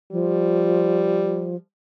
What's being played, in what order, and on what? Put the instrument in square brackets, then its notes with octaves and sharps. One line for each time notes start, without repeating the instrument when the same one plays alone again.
[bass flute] F3 [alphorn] G3